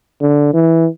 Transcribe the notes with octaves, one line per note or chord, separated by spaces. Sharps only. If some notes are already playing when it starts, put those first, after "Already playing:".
D3
E3